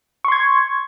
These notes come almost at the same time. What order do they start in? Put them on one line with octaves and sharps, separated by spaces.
C#6 C6 G#6